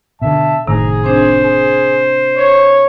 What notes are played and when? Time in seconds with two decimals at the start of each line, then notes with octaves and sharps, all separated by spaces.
0.22 B2 D3 E5 A5
0.67 F#1 A2 C3 D#3 G#4 A#5
1.04 C4 D4 C5
1.42 G#4
2.36 C#5